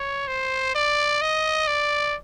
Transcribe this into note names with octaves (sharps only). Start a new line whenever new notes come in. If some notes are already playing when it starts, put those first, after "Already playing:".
Already playing: C#5
C5
D5
D#5
D5